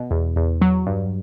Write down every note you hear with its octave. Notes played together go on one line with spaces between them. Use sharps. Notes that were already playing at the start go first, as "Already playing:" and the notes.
Already playing: B2
E2
E2
F#3
G2